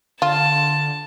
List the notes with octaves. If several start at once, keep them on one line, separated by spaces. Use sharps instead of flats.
D3 F4 A5